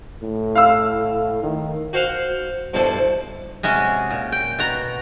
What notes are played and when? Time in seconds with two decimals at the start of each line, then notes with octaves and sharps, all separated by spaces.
0.23 A2
0.55 F5 E6
1.43 D#3
1.93 F#4 C5 F5 F#5
2.74 G2 B2 E4 A4 C5
3.63 C3 G#3 C#4 F#4
4.10 A#2
4.32 G5
4.59 B2 F#4 A#5